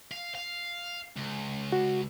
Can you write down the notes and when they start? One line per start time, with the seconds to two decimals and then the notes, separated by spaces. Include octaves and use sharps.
0.12 F5
0.35 F5
1.17 C#2
1.72 F#4